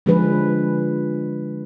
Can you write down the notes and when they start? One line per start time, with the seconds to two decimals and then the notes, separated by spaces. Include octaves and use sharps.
0.06 D3 F3 G#3 D4 G#4 B4